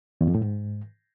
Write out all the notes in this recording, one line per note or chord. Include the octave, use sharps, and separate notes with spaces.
E2
F2
A2
G#2